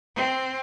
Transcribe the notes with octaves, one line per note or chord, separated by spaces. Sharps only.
C4